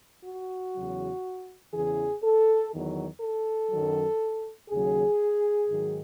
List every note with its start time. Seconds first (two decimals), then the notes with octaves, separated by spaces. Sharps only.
0.25 F#4
0.75 E2 C#3 F#3
1.73 E2 C#3 E3 G#4
2.23 A4
2.73 E2 D#3 F#3
3.21 A4
3.70 F#2 D#3 F#3
4.70 D#2 C#3 F#3 G#4
5.68 G#2 D#3 F#3